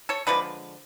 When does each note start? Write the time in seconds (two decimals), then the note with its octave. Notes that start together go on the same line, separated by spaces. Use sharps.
0.09 A4 C#5
0.27 D3 F3 G#3 B4 D5